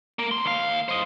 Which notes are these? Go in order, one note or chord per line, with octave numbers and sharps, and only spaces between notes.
A#3
B1 C6
D#2 F5
C5 D#5